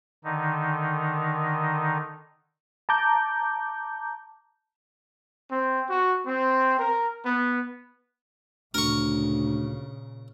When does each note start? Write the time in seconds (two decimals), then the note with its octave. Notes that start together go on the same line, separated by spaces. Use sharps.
0.24 D3 D#3 D#4
2.89 A5 A#5 D6 G6
5.51 C4
5.89 F#4
6.26 C4
6.79 A#4
7.25 B3
8.74 D2 A#2 C#3 A#4 C#6